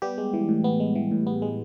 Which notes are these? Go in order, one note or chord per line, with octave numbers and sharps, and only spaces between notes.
G3 B3 G4
G#3
E3
A2
B3
G#3
E3
A2
B3
G#3